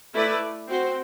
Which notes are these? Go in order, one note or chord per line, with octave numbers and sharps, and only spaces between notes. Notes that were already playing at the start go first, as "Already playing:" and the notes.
A3 E4 B4 D5
C4 F#4 C5